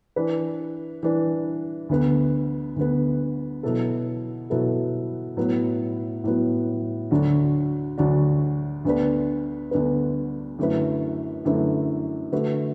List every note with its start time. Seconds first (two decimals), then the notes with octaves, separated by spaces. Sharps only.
0.16 E3 D4 B4
1.03 E3 D4 B4
1.89 D2 D3 B3
2.76 D2 D3 B3
3.63 B2 F#3 B3 E4 A4
4.50 B2 F#3 B3 E4 A4
5.37 A2 F#3 B3
6.24 A2 F#3 B3
7.11 D2 D3 F#3 D4 F#4
7.98 D2 D3 F#3 D4 F#4
8.85 D2 D3 B3 D4 B4
9.71 D2 D3 B3 D4 B4
10.59 F#2 D3 A3 E4 B4
11.45 F#2 D3 A3 E4 B4
12.32 D3 A3 F#4 B4